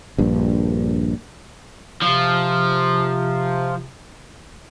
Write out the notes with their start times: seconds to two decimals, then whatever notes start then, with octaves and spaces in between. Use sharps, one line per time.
0.18 A#1 G2
2.02 C3 F3